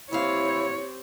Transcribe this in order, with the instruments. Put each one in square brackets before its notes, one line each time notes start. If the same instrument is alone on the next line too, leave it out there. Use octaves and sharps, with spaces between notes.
[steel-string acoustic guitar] D#2 E3 F5 [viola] C4 G4 [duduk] E4 [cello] C#5